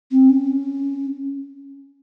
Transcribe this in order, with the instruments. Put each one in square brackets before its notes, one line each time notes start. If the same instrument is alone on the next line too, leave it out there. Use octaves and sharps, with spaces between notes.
[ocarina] C4
C#4